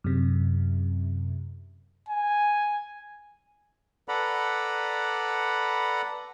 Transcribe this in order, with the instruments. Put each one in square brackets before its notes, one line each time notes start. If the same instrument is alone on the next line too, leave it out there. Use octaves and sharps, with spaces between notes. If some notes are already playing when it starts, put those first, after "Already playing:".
[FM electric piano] F#2 C3
[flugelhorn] G#5
[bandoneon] A4 B4 D5 F#5 A#5 B5